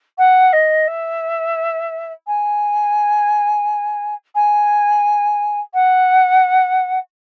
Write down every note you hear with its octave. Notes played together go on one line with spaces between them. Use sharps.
F#5
D#5
E5
G#5
G#5
F#5